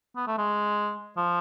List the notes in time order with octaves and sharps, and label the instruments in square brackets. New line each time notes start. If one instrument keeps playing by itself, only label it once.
[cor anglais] B3
A3
G#3
F3